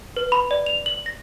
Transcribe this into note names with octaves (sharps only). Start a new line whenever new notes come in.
B4
B5
D5
F7
F#7
A#6